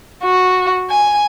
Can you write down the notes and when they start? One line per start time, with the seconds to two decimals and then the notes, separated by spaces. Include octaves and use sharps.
0.23 F#4
0.90 G#5